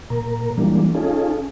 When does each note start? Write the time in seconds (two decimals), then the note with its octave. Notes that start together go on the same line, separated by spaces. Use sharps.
0.10 A#2 A#4
0.58 E3 F3 G3 G#3 A#3 D4
0.95 C#4 D#4 F4 G#4 A4